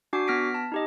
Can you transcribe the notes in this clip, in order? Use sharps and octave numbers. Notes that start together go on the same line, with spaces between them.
D4 F#4 G#5 D6 C7
B3 F6 A#6 B6 D7
A5
D#4 G4 D#5